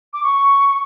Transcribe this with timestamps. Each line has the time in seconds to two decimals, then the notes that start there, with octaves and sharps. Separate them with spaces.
0.13 D6
0.23 C#6